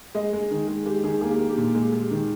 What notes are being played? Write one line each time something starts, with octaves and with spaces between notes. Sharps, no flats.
G#3 D#5
G#3
D#3
G#3
G#3 G4
D#3 G#4
A#3 G#4
G4
A#3
G4
A#2
G#3
G#3
D#3